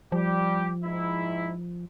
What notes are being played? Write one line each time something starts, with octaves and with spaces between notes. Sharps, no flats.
F3 G3 G4
G#2 E4